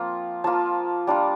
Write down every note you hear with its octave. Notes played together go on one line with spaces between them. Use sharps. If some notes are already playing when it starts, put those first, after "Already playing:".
Already playing: F3 A#3 C4 F4
F3 A#3 F4 A5
G3 D4 F4